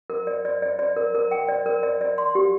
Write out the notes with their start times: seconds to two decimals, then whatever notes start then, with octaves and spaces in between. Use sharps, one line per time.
0.10 A#4
0.27 D5
0.45 D5
0.62 D5
0.79 D5
0.96 A#4
1.15 A#4
1.31 G5
1.49 D5
1.66 A#4
1.83 D5
2.01 D5
2.18 C6
2.35 G4